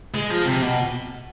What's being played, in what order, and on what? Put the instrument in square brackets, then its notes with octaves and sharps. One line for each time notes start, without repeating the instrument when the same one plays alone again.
[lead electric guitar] G#3
F3
C3
B2